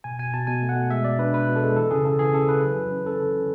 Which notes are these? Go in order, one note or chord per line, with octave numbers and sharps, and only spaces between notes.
B2 G#5
B2 G#5
B2 A5
B2 G#5
A3
F#5
B2
G#3 E5
B2 D5
D4 B4
B2 B4
B2
A4
G#3
E3 A4
C#3 G#4
C#3 A4
E3 G#4
C#3 A4
E3 B4
F#3
F#3
C#4
C#4 A4
D3
C#4